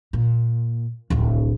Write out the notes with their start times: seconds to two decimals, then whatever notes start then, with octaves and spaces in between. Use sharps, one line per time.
0.13 A#2
1.10 D1 C2